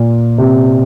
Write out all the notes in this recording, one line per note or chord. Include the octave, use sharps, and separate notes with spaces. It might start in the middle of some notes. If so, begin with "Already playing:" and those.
Already playing: A#2
C3